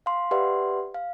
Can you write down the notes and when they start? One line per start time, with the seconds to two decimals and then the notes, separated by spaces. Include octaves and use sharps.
0.06 F5 C6
0.31 G4 B4 D5 E5 F#5 C6
0.94 F5